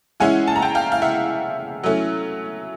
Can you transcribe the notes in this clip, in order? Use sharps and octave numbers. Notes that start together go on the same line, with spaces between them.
E3 G#3 C#4 E4 F#5 G#5
A5
A#5
G5 A5
F5 G5
F5
E5 F#5
F#3 A3 C#4 E4